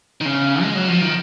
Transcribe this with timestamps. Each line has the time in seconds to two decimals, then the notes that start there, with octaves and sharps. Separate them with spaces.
0.21 D#3
0.25 C#3
0.62 G#3
0.75 F#3
0.88 F3
1.01 D#3